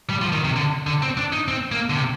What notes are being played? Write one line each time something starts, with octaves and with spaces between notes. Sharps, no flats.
G3
F3
D#3
C3
D3
D3
C4
D4
D#4
C4
A#3
D3
C3